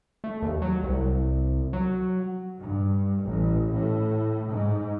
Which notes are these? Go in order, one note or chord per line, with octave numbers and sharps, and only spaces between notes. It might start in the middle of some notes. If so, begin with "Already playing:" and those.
A3
D#2
F#3
C2
F#3
G2
A1
A2
G#2